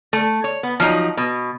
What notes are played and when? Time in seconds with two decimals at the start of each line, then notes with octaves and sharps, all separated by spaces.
0.13 A3
0.44 C#5
0.63 B3
0.80 F3 F#3 D#4
1.17 B2